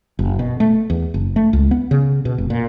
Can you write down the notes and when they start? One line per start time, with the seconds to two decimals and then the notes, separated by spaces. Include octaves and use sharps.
0.19 F#1
0.39 B2
0.60 A3
0.90 E2
1.14 F#1
1.36 A3
1.53 C#2
1.71 B3
1.91 C#3
2.25 B2
2.38 F1
2.50 A#2